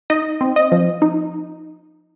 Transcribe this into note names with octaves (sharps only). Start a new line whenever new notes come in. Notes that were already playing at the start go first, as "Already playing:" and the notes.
D#4 D#5
C4
D#5
F3
D#4